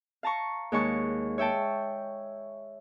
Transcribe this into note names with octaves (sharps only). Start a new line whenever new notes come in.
F5 A5 A#5 C#6
D#2 G#3 C#5 A5 C#6
C#5 E5 G5 A5